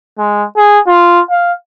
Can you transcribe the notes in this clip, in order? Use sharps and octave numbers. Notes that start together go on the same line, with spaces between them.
G#3
G#4
F4
F5